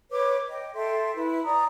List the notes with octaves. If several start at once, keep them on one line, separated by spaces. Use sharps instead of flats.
B4 C#5 D6
D#5 G5
A4 E5 G5 C6
E4 B4
D5 A#5 D#6